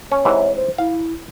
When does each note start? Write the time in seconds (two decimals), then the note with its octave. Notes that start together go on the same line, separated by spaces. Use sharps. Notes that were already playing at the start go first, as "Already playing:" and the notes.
0.12 C#4 C#5
0.25 G#2 C3 E3
0.56 C5
0.78 E4 F5